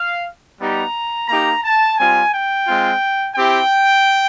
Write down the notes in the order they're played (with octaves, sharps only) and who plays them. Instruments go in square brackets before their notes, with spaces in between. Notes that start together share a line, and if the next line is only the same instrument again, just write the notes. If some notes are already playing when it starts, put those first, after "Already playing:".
Already playing: [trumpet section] F5
G3 B3 D#4 G4 A#5
A#3 D#4 G4 A#5
A5
G3 C4 F4 G#5
G5
G#3 C4 F4
C4 E4 G4 G5